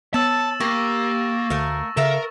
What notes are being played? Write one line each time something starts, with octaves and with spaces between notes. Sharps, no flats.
B3 C#5 A5 E6 A6 E7
A#3 G4 C#6 A#6
D2 A3 A#4 F5
C#3 A4 A#4 E5 F5